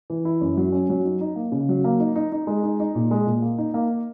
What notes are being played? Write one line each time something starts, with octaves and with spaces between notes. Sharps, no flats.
E3
E4
F#2
F#3
C#4
F#3
D#4
D#4
A#3
C#3
F#3
A#3
D#4
D#4
D#4
G#3
D#4
D#4
A#2
G#3
A#2
A#3
D#4
A#3